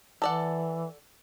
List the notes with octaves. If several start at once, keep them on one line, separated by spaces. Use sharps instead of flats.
E3 A4 D5 F#5